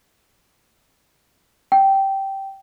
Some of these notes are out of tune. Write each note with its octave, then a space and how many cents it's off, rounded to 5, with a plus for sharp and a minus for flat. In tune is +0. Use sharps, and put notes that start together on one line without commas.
G5 -10